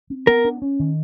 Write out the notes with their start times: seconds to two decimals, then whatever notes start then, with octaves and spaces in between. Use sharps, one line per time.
0.10 C4
0.27 B3 A#4
0.45 D4
0.62 C#4
0.79 D#3